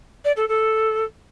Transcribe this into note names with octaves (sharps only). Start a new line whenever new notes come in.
D5
A4
A4